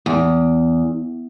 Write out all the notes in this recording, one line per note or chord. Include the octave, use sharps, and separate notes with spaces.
E2